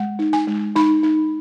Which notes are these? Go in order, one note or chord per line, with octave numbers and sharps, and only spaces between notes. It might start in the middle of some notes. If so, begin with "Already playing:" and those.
Already playing: G#3 F#5
D#4
G#5
G#3
D#4 B5
D#4